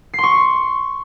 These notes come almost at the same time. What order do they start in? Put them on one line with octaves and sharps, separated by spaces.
C7 C6 C#6